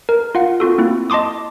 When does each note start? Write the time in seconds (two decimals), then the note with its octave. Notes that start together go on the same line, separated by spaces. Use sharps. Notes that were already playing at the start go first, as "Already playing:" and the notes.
0.09 A#4
0.35 F4 F5 F#5
0.60 C4 F4 F#4 A4
0.78 A#3 C4 E4
1.10 D#5 A5 C6 D6 D#6